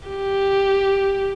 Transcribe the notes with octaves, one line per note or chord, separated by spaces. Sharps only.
G4